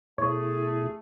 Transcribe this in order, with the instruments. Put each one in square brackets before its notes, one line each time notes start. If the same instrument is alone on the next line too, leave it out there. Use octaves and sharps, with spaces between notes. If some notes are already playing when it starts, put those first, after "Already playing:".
[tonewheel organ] B2 E4 [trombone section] A3 [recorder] G#4 [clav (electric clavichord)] C#5